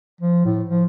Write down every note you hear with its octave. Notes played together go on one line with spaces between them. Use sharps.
F3
A2
F3